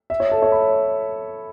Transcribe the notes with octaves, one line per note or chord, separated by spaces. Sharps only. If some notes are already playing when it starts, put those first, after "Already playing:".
E5
C#5
A4
C#5
B5